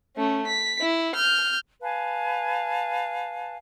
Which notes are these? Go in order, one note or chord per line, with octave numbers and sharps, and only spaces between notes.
A3 C#4
B6
E4
F6 G6
B4 F5 G#5 A5